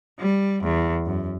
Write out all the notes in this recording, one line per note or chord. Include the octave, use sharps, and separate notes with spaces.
G3
E2
F#2